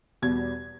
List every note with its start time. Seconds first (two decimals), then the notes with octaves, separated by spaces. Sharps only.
0.22 E2 B2 G3 G#6